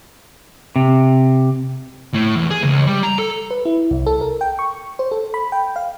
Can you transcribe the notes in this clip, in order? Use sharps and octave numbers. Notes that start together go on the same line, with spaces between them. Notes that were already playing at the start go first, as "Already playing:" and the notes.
C3
A2
E2
G#4
C#2
G3
A#5
A4
B4
E4
C2
A4
A#4
G5
C#6
C5
A4
B5
G5
F5